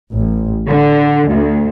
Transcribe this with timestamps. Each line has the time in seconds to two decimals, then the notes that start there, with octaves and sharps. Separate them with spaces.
0.14 A1
0.67 D3
1.27 D2